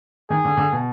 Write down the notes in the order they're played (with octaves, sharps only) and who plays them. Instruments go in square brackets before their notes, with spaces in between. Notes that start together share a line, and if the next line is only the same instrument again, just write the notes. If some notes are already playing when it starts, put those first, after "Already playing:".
[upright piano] D#3 [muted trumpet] G#4
[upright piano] D3
D3
B2